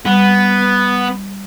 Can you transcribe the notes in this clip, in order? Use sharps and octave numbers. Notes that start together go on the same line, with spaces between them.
G3 B3